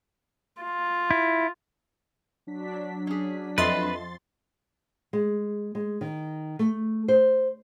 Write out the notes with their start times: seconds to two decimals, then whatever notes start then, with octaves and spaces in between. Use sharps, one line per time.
0.62 F4
1.11 E4
2.47 F#3 D4 B6
3.07 C#4 G#4
3.58 F2 A4 B4 D#5 E5 C6 A6
5.13 G#3
5.75 G#3
6.01 D#3
6.59 A3
7.08 C5